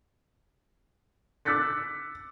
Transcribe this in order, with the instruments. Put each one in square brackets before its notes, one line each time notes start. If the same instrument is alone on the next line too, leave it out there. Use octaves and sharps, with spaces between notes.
[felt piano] D6 E6 F#6 A6 B6 C#7